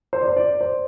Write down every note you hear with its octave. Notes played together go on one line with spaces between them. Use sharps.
C5
D5
C5
D5
C5